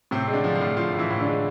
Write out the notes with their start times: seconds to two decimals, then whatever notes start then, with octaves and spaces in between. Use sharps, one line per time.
0.11 A2 C3 C4
0.28 G#3
0.33 D3 D4
0.44 F3
0.55 F3 F4
0.61 A2
0.77 F3 F4
0.93 A2
0.98 E3 E4
1.10 A2
1.20 D3 D4
1.26 G#3